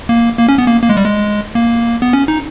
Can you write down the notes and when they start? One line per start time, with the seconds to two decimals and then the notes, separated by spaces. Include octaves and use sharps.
0.09 A#3
0.39 A#3
0.49 C#4
0.58 B3
0.67 A#3
0.83 A#3
0.89 G#3
0.97 G3
1.05 G#3
1.55 A#3
2.02 B3
2.13 C#4
2.28 D#4